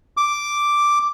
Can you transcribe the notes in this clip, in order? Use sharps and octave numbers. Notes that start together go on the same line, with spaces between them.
D6